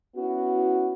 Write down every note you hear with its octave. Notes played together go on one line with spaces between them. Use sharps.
B3 C#4 E4 F#4